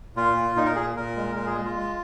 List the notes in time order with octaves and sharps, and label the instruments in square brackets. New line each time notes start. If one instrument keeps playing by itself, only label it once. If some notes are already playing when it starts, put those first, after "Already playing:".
[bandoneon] A#2 F4
A#2
A#2 D#4
A#4
A#2 G#4
A#2 A#4
G#3
A#2 A#4
G#4
G#3
F4
G#3